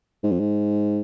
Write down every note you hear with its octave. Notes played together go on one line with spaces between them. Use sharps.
G#2
F2
G#2